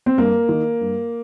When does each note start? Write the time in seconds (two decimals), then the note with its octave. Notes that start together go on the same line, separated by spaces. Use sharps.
0.06 C4
0.18 G2 A#3
0.49 D#3
0.81 G2